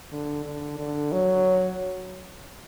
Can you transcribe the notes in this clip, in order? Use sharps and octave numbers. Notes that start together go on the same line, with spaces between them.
D3
D3
D3
F#3